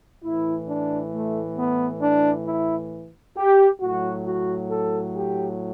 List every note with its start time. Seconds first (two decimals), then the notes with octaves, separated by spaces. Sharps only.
0.24 A2 E3 E4
0.69 D4
1.13 A3
1.58 B3
2.02 D4
2.46 E4
3.37 G4
3.81 A2 F#3 F#4
4.26 F#4
4.70 A4
5.16 G4